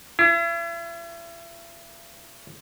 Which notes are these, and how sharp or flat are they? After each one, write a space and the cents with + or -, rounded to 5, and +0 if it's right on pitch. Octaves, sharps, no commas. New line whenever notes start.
E4 +40